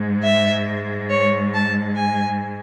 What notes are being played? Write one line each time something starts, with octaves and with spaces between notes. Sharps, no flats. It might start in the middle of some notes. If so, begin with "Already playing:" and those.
Already playing: G#2 G#3
E5
C#5
A5
G#5